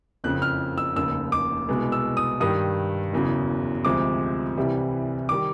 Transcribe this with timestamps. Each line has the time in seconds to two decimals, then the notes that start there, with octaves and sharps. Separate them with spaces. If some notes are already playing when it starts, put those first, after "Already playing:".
0.24 F#1 F2 C#3 F#6
0.42 F6
0.78 E6
0.96 F1 D#2 C#3 E6
1.32 D6
1.69 C2 B2 G#3 B3
1.92 E6
2.17 D#6
2.40 G2 D#3 G3 D#6
3.13 F#1 E2 C#3 F#3
3.85 D2 C3 F3 G#3 D6
4.57 C2 C3 E3 G3
5.29 D#3 G3 D6